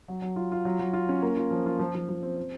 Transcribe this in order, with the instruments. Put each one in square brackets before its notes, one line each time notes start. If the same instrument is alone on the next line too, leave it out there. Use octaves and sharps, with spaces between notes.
[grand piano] F#3
F#3
F4
F4
F#3
F#3
F4
C#4
A#3
F4
F3
F4
F3
F3
F3
C4
C4